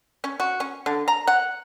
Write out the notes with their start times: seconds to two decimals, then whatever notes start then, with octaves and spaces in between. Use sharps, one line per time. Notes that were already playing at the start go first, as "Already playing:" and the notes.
0.24 C#4
0.40 F#4
0.60 C#4
0.86 D3
1.08 A#5
1.27 F#5